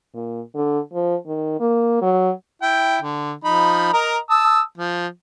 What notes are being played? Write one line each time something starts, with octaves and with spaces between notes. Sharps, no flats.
A#2
D3
F3
D#3
A#3
F#3
E4 G5
D3
F3 D#4 B5
A#4 D#5 A#5
A5 D#6 E6
F3